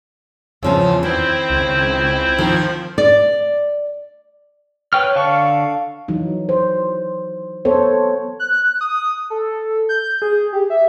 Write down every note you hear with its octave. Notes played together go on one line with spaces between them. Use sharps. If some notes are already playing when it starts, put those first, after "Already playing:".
E2 C#3 F3 C#4 E6
D#3 C4 E4 C5
C#2
D#3 F3
D5
B4 C#5 G5 F6
D3 F5 A5 C#6
E3 F#3 D#4
C5
B3 A4 C5 C#5
F#6
D#6
A4
G6
G#4
G4
E5